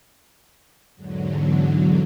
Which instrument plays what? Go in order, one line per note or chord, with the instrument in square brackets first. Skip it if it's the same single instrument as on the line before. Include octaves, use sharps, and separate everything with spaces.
[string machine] E2 G#2 D3 F#3